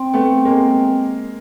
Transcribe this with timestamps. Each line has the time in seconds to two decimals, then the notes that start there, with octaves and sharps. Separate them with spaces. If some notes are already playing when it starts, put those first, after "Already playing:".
Already playing: C4
0.14 A3 B3
0.45 G#3 A#3